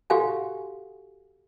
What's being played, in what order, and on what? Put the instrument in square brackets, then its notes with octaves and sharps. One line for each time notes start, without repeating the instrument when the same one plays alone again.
[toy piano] F#4 G4 A4 F5 F#5 G#5